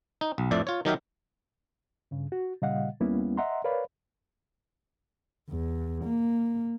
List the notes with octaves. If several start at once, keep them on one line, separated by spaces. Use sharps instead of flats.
D#4
B1
F2 A2 D4 D5 E5
F4 C#5
D#3 F#3 D#4 G4 A#4 E5
G2 C#3
F#4
A#2 C#3 G3 D#5 F5 F#5
D#2 G3 A#3 B3 C#4 E4
D#5 E5 F#5 A#5 C6
A#4 B4 C#5 D5 F5 B5
E2
A#3